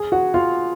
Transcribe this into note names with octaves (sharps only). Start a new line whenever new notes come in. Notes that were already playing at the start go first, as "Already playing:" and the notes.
Already playing: G#4 G#5
F#4 F#5
F4 F5